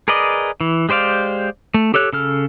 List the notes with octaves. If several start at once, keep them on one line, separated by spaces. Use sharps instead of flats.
G#4 A#4 B4 D5 D#5
E3
G#3 G4 C5 D5 F5
A3
G4 A4 C#5 F#6
C#3 A4 F6